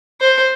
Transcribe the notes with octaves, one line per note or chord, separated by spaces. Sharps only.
C5